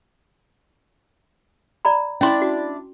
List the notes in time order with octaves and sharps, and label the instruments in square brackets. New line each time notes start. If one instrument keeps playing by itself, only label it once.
[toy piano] D5 A#5 B5
[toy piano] C#4 C6 [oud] D4 E4
[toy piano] F#4